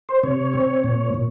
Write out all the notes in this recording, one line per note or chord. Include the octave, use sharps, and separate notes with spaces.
C5
C3 C#5
C4
A#2
A#2